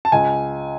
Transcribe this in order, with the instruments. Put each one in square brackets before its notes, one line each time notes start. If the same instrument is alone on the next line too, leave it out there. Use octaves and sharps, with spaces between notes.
[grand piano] A5
[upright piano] C#2 [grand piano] G#5